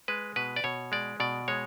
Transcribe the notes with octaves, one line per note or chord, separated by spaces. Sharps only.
G#3 B4
B2 B4
D5
B2 C#5
G#3 D5
B2 D5
G#3 C#5